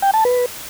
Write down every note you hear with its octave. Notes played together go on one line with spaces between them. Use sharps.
G5
A5
B4